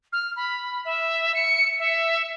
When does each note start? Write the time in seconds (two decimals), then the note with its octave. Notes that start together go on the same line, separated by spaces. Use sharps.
0.13 F6
0.36 B5
0.85 E5
1.35 C#7
1.79 E5